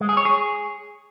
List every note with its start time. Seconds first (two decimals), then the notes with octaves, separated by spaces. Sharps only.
0.01 G#3
0.09 G#4
0.17 C#5
0.25 G#4